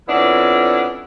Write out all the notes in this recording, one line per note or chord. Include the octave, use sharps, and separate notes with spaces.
F2 B3 C#4 D4 E4